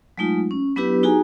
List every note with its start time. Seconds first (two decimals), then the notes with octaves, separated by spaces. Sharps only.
0.18 F#3 G#3 A3 D#4 F4
0.51 C#4
0.76 F#3 B3 D4 E4 G4 B4
1.03 D#4 F#4 G#4 G#5 A#5